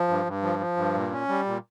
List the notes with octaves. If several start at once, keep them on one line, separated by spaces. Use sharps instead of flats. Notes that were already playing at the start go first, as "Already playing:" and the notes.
Already playing: F3
G2
G2
F3
F3
G2
A#2
C#4
G3
A#2